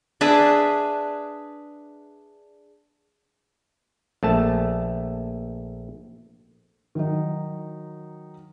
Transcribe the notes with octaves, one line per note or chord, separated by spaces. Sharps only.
D4 G#4 B4 E5
A#1 A3 A5
D#3 F#3 D#4